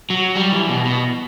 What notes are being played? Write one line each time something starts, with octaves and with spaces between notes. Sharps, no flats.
F#3
G3
E3
B2
B2